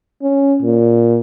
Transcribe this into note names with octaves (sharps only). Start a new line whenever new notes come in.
C#4
A#2